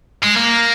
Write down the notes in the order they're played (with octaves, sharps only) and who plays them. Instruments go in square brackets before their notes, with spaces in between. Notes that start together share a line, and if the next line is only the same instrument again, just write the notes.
[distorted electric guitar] G#3
A#3